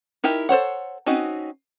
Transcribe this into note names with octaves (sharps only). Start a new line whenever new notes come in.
D#4 E4 G4 A#4
A4 C5 C#5 F#5
C4 C#4 D#4 F#4 D#5